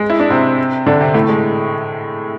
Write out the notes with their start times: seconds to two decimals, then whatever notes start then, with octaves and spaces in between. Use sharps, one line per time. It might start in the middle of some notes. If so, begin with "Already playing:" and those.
Already playing: G#3
0.10 E4
0.20 D4
0.30 C3 C4
0.86 D3 D4
1.00 C3 C4
1.14 A2 A3
1.29 G#3